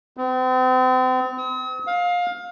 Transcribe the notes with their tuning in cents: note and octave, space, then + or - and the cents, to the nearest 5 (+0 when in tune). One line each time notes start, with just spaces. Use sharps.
C4 -40
D#6 +45
F5 +20